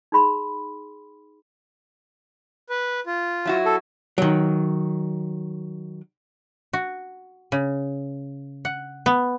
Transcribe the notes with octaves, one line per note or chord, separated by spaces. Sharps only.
D#4 G#4 B5 C6
B4
F4
F#3 E4 F#4
A4
D#3 F#3
F#4
C#3
F#5
B3